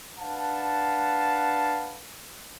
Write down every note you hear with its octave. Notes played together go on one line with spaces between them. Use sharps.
D4 B4 F5 F#5 A5